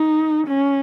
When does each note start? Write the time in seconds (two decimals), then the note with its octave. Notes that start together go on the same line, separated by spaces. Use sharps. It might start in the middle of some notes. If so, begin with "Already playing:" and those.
Already playing: D#4
0.48 C#4